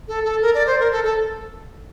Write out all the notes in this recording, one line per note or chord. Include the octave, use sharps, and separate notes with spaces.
A4
A4
A#4
D5
C5
A#4
A4
A4